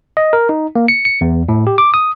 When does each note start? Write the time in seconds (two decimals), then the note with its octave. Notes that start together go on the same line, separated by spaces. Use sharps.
0.17 D#5
0.33 A#4
0.49 D#4
0.75 A#3
0.88 C#7
1.05 C#7
1.21 E2
1.49 A2
1.67 G4
1.78 D6
1.94 D#6